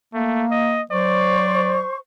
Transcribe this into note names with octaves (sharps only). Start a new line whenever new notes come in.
A3 A#3
D#5
F#3 C5 D5 C#6